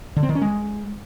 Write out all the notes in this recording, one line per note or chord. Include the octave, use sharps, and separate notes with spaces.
D3
C4
D#3
C#4
G#3